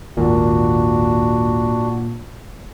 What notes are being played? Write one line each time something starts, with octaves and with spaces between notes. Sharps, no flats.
G#1 D#2 A#2 D4 F#4